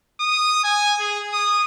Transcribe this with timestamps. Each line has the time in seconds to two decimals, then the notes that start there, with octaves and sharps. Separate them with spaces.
0.20 D#6
0.64 G#5
1.00 G#4
1.33 D#6